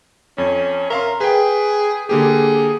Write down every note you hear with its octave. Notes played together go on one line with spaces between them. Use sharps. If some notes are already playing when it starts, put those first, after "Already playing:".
F2 C#4
A#4 E5 F5 C6
G#4 B4 G5
D3 A#3 G4 G#4